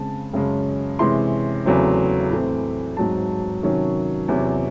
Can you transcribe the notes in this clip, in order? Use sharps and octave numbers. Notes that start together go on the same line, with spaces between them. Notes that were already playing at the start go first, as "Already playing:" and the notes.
Already playing: C#3 G#3 C4 A5
F#2 C#3 G#3 C#4
C3 E3 G#3 C#4 C6
E2 C#3 F#3 A3 C4
A2 E3 A3 C4
G#2 F#3 C4 A5
C3 D#3 F#3 C#4
E2 C3 F#3 C#4